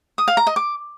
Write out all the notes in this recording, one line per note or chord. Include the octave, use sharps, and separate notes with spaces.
D#6
F5
A#5
D#5
D6